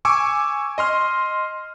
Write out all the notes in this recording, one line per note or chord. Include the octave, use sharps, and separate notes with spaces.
G#5 C#6 D6 E6
D#5 C6 F6